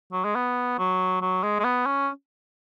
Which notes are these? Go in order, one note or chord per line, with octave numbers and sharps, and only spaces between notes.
F#3
G#3
B3
F#3
F#3
G#3
G#3
B3
C#4